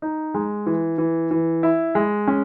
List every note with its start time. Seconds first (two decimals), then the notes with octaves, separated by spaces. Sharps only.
0.02 D#4
0.34 G#3
0.66 E3
0.98 E3
1.31 E3
1.63 E4
1.95 G#3
2.28 C#4